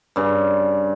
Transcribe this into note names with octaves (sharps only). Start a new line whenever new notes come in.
G2 C#3